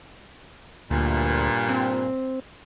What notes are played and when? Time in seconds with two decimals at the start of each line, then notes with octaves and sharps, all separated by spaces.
0.91 D2 G2 A#2
1.69 C4